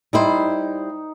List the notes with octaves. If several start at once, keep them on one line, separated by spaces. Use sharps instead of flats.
G3 D#4 E4 C5